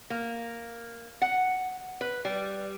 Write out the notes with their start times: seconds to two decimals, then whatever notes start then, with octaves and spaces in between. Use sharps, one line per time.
0.10 A#3
1.22 F#5
2.01 B4
2.25 G3